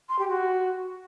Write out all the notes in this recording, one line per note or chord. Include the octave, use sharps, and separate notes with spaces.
C6
G4
F#4